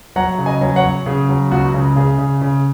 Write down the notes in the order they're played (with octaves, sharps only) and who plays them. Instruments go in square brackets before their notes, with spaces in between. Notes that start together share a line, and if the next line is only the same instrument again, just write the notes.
[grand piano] F#3 F#5 A#5
C#3
D#5 G#5
F#3
C#5 F#5
F#3
C#3 G#4
F#3
C#2 F#4
C#3
C#3 G#4
C#3
C#3